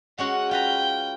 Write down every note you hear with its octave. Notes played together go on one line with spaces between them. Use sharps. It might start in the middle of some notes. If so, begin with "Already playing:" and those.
G#3 C#4 F#4 F#5
F4 B4 G5 A#5